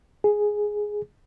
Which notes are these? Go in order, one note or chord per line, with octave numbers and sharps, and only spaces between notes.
G#4